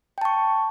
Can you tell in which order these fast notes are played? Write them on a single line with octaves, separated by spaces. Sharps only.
G5 A5 C#6